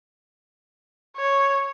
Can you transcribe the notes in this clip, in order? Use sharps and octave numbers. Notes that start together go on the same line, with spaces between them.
C#5